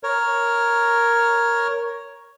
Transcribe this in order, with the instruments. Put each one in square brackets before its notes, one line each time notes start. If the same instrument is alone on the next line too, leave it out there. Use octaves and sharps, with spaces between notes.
[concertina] A#4 C#5